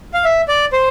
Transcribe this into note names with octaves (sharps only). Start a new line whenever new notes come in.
F5
E5
D5
C5